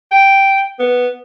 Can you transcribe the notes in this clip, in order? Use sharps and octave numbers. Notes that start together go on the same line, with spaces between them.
G5
B3